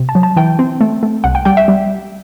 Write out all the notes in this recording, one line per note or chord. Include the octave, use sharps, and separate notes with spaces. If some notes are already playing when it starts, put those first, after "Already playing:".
Already playing: C3
A5
F#3
A5
E3 G5
C4
A3
A3
C2 F#5
G5
G3 G5
E5
G3